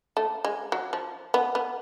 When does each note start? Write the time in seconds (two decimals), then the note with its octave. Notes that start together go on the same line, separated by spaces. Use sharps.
0.17 A3
0.44 G#3
0.72 F#3
0.93 F3
1.34 B3
1.55 B3